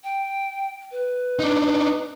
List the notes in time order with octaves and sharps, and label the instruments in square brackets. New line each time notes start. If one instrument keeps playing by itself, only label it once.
[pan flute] G5
B4
[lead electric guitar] D4 D#4